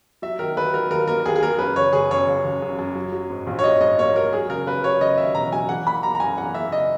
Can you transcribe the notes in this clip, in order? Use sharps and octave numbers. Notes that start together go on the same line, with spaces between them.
F#3 E5
D#3 A#4
D#2 B4
F#3 A#4
D#2 A#4
A#3 A#4
D#2 G#4
G#4
A#3 A#4
F#2 B4
F#1 C#5
F#1 G#4
F#2 C#5
F#1
F#1
F#2
F#2
F#3
F#3
G#2
A#1
C#5
F#3 D#5
G#2 D#5
A#3 C#5
F#3 A#4
F#3 G#4
C#3 A#4
C#3 B4
F#3 C#5
C#3 D#5
D#2 E5
E1 A#5
F#3 G#5
E3 F#5
A#3 B5
A#3 A#5
A#5
F#2 G#5
E3 F#5
A#3 E5
C#3 D#5